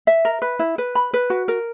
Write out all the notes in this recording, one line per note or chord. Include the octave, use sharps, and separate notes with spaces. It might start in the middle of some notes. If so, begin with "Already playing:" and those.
E5
A#4
B4
E4
B4
B5
B4
F#4
A#4